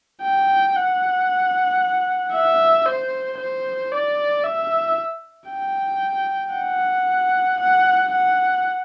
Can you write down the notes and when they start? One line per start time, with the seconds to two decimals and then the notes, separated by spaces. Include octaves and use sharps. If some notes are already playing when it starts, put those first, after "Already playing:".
0.22 G5
0.76 F#5
2.33 E5
2.86 C5
3.38 C5
3.92 D5
4.44 E5
5.50 G5
6.54 F#5
7.60 F#5
8.13 F#5